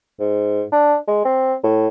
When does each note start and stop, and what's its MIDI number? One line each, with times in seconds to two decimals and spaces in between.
0.20 0.63 44
0.72 0.96 62
1.08 1.22 56
1.25 1.55 60
1.63 1.88 45